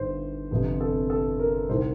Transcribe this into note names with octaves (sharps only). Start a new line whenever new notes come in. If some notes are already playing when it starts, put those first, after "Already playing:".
Already playing: G1 G2 D#3 C5
G1 F2 C3
A4
A4
A#4
C2 C3 D#3 C5